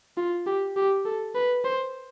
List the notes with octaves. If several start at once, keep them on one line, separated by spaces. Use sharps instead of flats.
F4
G4
G4
A4
B4
C5